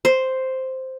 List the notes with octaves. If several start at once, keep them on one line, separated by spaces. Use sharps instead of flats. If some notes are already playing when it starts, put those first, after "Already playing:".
C5